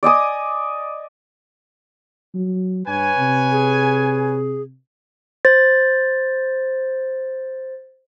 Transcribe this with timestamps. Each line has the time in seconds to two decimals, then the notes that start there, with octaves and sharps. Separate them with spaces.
0.03 D5 D#5 G#5 D#6
2.35 F#3
2.87 G2 B4 C#5 G#5
3.17 C3
3.52 G#4
5.45 C5 A6